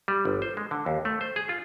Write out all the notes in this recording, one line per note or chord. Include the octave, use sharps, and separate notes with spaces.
G3
G1
C5
G#3
D3
D#2
A3
C5
G#4
F4